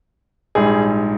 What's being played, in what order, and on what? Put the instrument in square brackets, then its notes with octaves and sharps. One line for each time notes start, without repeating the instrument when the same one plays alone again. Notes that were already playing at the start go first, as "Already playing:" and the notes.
[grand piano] A#1 G#2 G3 G#4